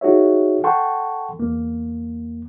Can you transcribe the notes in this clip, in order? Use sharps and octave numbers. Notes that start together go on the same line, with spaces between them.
D#4 F#4 G#4 C#5 E5
A4 F#5 G5 A5 C6 C#6
E2 A#3